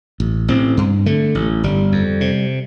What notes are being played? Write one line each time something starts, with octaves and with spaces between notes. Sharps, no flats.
A1
A1 C4
G2
D3 A3
A1
G1 G3
F2
C3